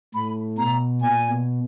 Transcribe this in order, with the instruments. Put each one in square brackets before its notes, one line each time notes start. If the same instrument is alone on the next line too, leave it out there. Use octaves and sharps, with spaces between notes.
[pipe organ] A2 [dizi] B5
[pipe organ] B2 [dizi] A#5
[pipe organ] A#2 [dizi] G#5
[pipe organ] B2